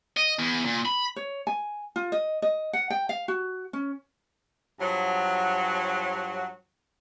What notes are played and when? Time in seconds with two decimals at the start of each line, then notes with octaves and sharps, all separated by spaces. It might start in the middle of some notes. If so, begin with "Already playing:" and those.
0.17 D#5
0.39 E2
0.65 A#2
0.85 B5
1.16 C#5
1.47 G#5
1.96 F4
2.12 D#5
2.42 D#5
2.73 F#5
2.90 G5
3.09 F5
3.28 F#4
3.73 C#4
4.79 G2 F3 F#3